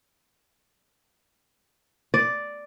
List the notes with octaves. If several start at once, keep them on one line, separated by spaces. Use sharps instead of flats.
D5